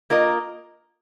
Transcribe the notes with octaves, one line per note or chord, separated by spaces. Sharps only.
A#3 F4 A#4 D#5